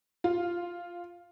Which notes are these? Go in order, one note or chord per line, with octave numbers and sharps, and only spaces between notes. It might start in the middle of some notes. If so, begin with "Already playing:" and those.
F4